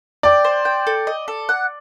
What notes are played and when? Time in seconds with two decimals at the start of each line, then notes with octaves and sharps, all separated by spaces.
0.23 D5 G5
0.45 C5
0.65 G5
0.87 A4
1.07 D#5
1.28 A4
1.49 F#5